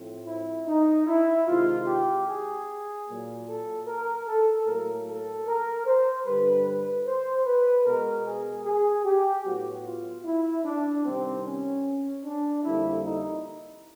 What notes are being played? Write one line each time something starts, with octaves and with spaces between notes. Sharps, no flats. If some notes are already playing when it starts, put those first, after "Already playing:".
Already playing: A2 F3 A3 C4
E4
D#4
E4
C3 D#3 G#3 F4
G4
G#4
A#2 F#3 A#3
A4
A#4
A4
A2 F#3 A#3 A#4
A4
A#4
C5
G2 D3 G3 B4
B4
C5
B4
B2 G#3 B3 A#4
G#4
G#4
G4
A2 F#3 B3 F#4
F4
E4
D4
C3 D#3 G3 C4
C#4
D4
F2 D3 G3 A#3 E4
D#4